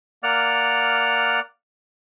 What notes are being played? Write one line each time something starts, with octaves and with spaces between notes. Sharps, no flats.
A#3 D5 F#5 F6